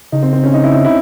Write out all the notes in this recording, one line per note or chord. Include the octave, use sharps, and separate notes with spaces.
C#3 D#4
C4
C4
C#4
D#4
E4
E4
E4